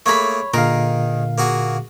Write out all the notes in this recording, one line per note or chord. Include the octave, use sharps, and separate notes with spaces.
A3 A#3 G#4 C#5 B5
A#2 D3 D#3 G#4 A#4 F5
A#3 F#4 G#4